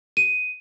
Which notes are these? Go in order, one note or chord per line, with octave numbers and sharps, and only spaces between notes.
D#7